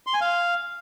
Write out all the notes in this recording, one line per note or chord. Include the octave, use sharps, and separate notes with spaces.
C6
G#5
F5